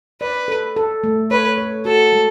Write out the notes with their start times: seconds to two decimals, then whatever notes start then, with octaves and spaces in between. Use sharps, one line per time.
0.21 B4 D5
0.48 A4
0.76 A4
1.04 A3
1.31 B4 C#5
1.58 C#5
1.85 F#4 A4
2.13 G#3